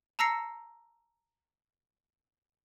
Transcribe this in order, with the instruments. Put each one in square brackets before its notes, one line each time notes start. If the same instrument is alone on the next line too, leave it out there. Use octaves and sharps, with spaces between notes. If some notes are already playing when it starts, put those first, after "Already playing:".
[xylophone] A5 A#5 E6 A#6 C7 C#7